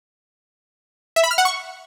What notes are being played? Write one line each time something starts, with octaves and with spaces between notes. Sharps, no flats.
E5
B5
F6
F#5
C#6